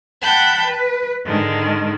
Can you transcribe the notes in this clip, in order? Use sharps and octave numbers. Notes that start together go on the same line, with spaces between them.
F#5 G5 A5 B5 G6
B4
G#2 D3 D#3